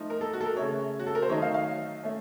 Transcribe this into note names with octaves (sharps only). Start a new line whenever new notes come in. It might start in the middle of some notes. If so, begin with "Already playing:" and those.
Already playing: F3 A3 D#4
A#4
A4
F#4
A4
A#4
C#3 A3 C#4 C#5
F#4
A4
A#4
C5
D#3 F#3 A3 D#4 C#5
F5
F5
A3 C#4